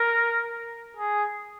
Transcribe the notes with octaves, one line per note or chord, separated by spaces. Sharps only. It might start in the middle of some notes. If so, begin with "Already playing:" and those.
Already playing: A#4
G#4